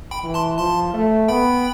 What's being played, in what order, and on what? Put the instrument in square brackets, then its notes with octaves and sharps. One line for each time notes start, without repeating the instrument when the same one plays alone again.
[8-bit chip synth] G5 B5
[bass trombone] E3
[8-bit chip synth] A5 C6
[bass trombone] F3 [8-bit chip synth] A5 C6
[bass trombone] A3
[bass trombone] B3 [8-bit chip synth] G5 B5